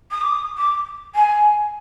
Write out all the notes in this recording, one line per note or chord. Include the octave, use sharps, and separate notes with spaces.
D#6
D6
D#6
D6
G#5